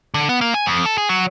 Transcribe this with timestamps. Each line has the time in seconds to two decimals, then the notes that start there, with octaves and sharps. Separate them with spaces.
0.14 D3
0.29 B3
0.41 A#3
0.54 G#5
0.66 F2
0.86 A4
0.98 G#4
1.09 F#3